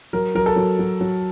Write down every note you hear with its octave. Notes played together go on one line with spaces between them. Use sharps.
F#3 A#4
F#3 A#4
A4
F#3
F#3
F#3